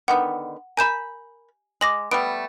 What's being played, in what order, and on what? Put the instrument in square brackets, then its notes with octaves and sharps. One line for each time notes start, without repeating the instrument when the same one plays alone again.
[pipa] D3 D#3 B3 [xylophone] F#5
[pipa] A#4 B5 [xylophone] G#5 G6 E7
[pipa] G#3 [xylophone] D6 A#6 F#7
[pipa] G3 A3 B3 [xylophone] D7